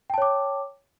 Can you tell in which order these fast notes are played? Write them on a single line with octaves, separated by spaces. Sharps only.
G5 A5 C#5 D6